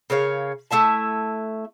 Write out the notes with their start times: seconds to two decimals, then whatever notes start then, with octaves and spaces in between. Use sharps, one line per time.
0.10 C#3 A#4 C#5 F5
0.71 A3 E4 E5 A5